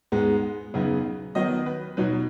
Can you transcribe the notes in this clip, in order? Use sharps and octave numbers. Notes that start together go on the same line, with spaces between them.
G#2 G#3 B3
F#2 C#3 B3 D#4
D#3 F#3 B3 D#4 D#5
B4
B2 F#3 D#4 B4